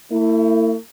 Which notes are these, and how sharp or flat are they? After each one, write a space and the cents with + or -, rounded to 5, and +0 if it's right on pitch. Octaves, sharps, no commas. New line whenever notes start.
A3 +45 E4 +0